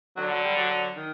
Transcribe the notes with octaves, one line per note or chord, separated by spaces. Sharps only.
D3 F#3
F#3
G3
F#3
F#3
D#3